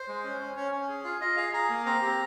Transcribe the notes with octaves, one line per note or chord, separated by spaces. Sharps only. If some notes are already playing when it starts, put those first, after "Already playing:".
Already playing: C5
G#3
C#4
C#4
C#4 C#5
C#4
G#4
F4
F4 D#5
G#4 F5
G#4 A#5
A#3
C4 A#5
G4